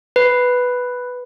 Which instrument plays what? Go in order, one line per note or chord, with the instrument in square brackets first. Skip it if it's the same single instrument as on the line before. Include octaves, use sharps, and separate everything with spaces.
[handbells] B4